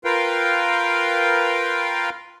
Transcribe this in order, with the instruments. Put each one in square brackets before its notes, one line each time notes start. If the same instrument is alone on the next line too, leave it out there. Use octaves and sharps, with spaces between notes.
[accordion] F4 A#4 B4 F5 G5